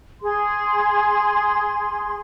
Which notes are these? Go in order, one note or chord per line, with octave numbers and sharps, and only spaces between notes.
G#4 C6